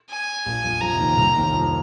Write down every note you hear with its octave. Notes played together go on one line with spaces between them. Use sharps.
G#5
A#1 A#2
F2 F3
F2 F3 A#5
C3
D#2 D#3
C2 C3
D#2 D#3
F2 F3